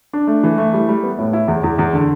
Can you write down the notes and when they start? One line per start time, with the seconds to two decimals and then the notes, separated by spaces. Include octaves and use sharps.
0.13 D4
0.27 A3
0.44 E3
0.58 A3
0.74 G3
0.89 G3
1.03 B3
1.18 A2
1.33 E4
1.48 E2
1.63 E2
1.78 E2
1.93 D3